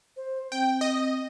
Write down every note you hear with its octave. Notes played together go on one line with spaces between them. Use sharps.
C5
C4 G5
D#5